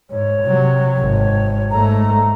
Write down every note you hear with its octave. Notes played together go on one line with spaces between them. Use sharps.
G#2 C#5
C3 F#3
G#1
G#2 A3 A#5